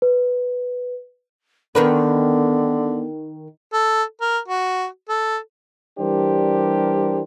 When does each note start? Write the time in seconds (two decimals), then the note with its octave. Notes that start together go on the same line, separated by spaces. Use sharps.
0.02 B4
1.75 D3 D#3 B3 A#4 B4
3.73 A4
4.21 A#4
4.48 F#4
5.09 A4
5.99 E3 G3 D4 G4 A#4 C5